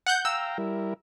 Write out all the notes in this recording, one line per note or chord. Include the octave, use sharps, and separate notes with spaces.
F#5 F#6 G6
F5 G5 A#5 E6
G3 E4 A#4